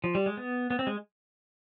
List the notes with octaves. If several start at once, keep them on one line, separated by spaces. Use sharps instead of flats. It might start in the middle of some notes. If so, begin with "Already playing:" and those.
F3
G3
G#3
B3
B3
C4
G#3